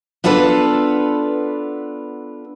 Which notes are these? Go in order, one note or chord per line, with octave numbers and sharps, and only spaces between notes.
B3 D4 F4 A4 B4